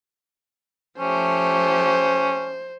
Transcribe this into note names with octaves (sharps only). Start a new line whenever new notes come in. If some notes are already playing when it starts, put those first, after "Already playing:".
F3 A3 C#4 G4 C5